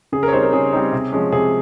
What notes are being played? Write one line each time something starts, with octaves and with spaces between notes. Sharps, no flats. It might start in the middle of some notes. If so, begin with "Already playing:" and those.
C#3 G#4
A#4
C#5
G3 C4 D#4 C5
A#4
C#3 G#4
G3 C4 D#4
C3
F3 G#3 C#4
C3 G#4